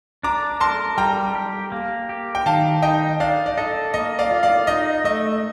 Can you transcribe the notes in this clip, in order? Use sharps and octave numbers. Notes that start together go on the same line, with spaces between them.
D4 A#5 D6
A#4 A5 C6
G3 G5 A#5
G4
A#3
G4
G5
D#3 F5 A5
D#4 D#5 G5
D4 D5 F5
D5
A4 D#5
A#3 D#5
D5 F5
F4
D5 F5
D#4 D#5
A3 D#5